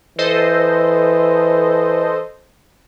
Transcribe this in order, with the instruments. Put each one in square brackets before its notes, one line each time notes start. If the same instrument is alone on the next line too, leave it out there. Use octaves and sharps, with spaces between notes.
[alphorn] E3 [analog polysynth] A4 C5 D#5